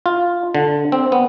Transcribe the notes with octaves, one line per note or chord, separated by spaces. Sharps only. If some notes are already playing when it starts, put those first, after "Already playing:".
F4
D3
C4
B3